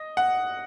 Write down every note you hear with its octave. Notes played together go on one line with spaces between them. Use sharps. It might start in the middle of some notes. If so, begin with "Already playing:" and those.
Already playing: D#5
F#5